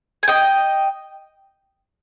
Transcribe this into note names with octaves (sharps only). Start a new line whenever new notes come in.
G#5
D#5 G5